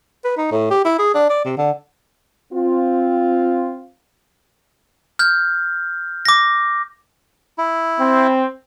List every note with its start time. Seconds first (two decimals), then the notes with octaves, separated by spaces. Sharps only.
0.24 B4
0.37 D#4
0.52 A2
0.71 G4
0.85 E4
0.99 G#4
1.14 D4
1.29 D5
1.44 C3
1.57 D3
2.52 C4 F4
5.19 F6 G6
6.25 D6 A#6
7.58 E4
8.00 C4